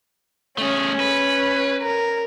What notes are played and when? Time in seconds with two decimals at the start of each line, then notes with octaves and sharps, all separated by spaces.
0.58 A3 C#4 G#4
1.00 B4
1.81 A#4